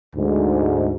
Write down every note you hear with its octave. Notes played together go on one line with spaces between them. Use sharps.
D2 G#2